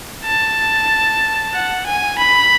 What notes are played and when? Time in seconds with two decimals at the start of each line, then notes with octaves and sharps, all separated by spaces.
0.25 A5
1.54 F#5
1.86 G#5
2.19 B5